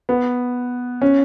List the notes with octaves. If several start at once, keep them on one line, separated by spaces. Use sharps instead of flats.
B3
C#4